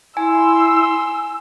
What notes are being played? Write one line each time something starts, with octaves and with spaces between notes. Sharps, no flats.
E4 G#5 C6 E6